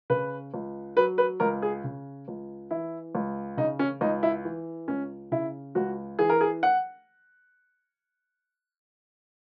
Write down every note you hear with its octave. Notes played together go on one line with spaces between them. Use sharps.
C#3 B4
C#2
F#3 B4
B4
C#2 A#4
G#4
C#3
C#2
E3 E4
C#2
C#3 D#4
C#4
C#2 D#4
E4
E3
C#2 C#4
C#3 E4
C#2 F#4
E3 G#4
A#4
G#4
F#5